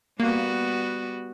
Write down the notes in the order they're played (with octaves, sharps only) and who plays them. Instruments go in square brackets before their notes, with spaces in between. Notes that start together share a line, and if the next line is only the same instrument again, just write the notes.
[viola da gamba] G3 B3 F#4 [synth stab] A#3